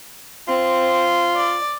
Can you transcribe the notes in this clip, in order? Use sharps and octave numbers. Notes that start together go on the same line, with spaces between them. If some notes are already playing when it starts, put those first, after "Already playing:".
C4 F4
D5